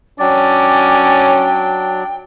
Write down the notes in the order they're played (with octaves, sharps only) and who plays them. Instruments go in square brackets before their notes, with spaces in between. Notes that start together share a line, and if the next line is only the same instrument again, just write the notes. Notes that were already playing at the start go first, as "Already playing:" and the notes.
[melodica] F#3 D4 [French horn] C#4 [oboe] D5 [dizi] G5